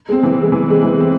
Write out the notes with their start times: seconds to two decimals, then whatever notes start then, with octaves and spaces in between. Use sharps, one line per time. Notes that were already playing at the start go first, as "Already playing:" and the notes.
0.09 G#3 C4
0.23 E3
0.38 G#3 C4
0.52 E3
0.68 G#3 C4
0.83 E3
0.97 G#3 C4